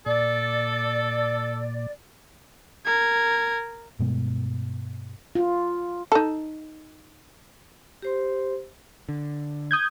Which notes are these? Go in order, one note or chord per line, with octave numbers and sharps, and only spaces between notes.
A#2 A4 D5
A#4 G#6
G2 B2 G#3
F4
D#4 A4
G4 C5 C6
D3
D#6 G6 G#6